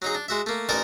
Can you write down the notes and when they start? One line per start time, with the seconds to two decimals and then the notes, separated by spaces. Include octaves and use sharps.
0.02 F#3 D#4 G#4
0.15 D4
0.28 G#3 F#4 E5
0.46 A3 A#3
0.69 A1 D#4 A#4 D5 G#5 A5